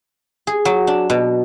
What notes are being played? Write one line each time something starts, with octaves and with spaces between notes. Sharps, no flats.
G#4
F#3
D4
B2